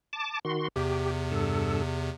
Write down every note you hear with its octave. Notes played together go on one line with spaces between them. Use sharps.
A5 D6
D#3 F#4 C6
E2 C3 G4
G2 A4